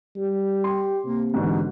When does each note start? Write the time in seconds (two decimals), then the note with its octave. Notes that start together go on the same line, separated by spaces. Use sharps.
0.16 G3
0.64 G4 C6
1.05 C3 A#3
1.34 G#2 B2 D3 E3